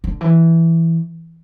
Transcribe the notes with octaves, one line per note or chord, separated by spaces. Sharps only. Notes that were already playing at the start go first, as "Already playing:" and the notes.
D3
E3